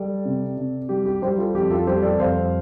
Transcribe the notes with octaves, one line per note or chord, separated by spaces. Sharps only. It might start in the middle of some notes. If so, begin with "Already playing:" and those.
Already playing: G3 A4 D5
C3
C3
G3 G4
G4
G3 G4 C5
F4 A4
F2 G4
F4 A4
G3 G4 C5
A4 D5
F2 C5 F5